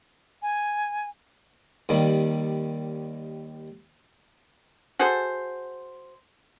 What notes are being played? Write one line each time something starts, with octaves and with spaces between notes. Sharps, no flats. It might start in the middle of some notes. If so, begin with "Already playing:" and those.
G#5
D#2 D#3 G3
F#4 G#4 A4 C5